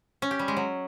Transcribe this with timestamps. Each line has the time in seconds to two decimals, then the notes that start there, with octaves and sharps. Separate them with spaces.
0.22 C#4
0.31 G4
0.39 G3
0.48 G#3
0.57 F#3